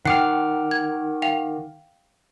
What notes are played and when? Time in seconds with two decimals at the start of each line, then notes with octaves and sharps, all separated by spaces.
0.05 D#3 F#5 G5 D6 F6 C7
0.71 G#6
1.22 F5 G5 F7